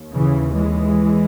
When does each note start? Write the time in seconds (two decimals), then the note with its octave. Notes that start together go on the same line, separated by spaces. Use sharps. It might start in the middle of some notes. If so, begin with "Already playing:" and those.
Already playing: D#2
0.15 C#3 E3
0.55 E3 G#3